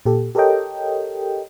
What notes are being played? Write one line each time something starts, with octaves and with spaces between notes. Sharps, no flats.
A#2 G4 A4
G4 A4 A#4 C#5 D#5 G5